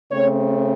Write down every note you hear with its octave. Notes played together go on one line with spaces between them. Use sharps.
C#3 A3 C4 C#5